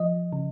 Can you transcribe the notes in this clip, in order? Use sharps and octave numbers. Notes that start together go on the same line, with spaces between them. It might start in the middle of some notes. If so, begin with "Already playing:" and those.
Already playing: F3 D#5
C#3